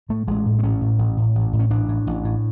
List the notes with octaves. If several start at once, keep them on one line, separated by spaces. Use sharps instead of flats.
A2 A3
A1 G#3
A2
C4
A1 C#4
A2
A1
A2
A1
A2
C#4
A1 D4
A2
A1
A2